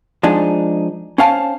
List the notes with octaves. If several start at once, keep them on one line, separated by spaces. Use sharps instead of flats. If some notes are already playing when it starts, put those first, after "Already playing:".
F3 G#3 D4 D#4
C#4 C5 F5 A5